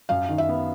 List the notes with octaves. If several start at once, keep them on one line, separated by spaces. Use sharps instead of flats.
F#2 F5
D#3
E5
B3